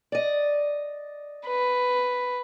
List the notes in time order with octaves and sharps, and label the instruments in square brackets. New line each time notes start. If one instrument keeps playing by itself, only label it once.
[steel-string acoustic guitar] D5 D#5
[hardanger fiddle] B4